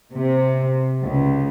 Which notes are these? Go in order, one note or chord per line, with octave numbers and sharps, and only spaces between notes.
C3
C#2